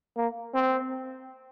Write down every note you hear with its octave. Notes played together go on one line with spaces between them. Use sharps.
A#3
C4